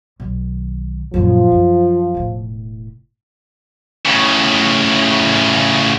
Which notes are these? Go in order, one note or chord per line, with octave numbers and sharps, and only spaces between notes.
B1 D#3
F#2 A#2 F3
F#2
E1 A2
A2 C#3